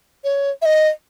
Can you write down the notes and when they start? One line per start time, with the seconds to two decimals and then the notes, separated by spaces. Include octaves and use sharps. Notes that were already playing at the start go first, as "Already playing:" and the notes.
0.24 C#5
0.62 E5
0.65 D#5